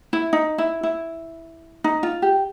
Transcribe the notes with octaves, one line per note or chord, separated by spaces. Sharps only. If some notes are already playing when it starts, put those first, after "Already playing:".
E4
D#4
E4
E4
D#4
F4
G4